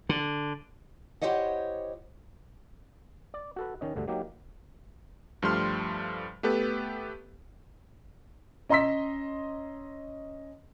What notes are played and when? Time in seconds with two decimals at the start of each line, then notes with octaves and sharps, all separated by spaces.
0.09 D3
1.22 E4 G4 C5 C#5 D#5 F#5
3.34 D5
3.56 F#4 A4 B4
3.81 D#3 C#4 D#5
3.96 D2 G2 D3 A3
4.08 F#3 A#3 D#4 G4
5.42 G2 F3 G3 A3 C6 F6
6.43 A3 B3 G4 A4 B4
8.69 C#4 D#5 A#5 C6 E6 B6